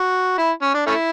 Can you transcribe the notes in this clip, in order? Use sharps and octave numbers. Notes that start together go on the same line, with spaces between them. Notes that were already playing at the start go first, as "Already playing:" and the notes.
Already playing: F#4
E4
C#4
D4
A3 C#4 E4